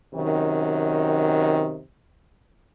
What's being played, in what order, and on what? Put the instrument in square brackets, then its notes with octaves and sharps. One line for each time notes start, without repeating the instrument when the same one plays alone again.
[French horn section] F#2 C3 D#3